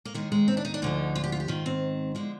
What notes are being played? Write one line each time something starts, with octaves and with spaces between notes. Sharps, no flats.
A#3
D#2 D#3 G#3
G#3
C4
D4
D#4
D4
D2 D3 F3 D#4
F4
G4
F4
G4
G#2 D#3 F4
C4
D3 F3 G#3